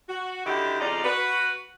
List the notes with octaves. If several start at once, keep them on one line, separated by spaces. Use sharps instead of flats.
F#4
D3 D#3 E4 F#4 G4
F2 C#3 D#4 F4 D5
F#4 B4